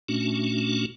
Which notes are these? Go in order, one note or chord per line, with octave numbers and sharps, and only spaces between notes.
A#2 A3 C#4 D4 F#4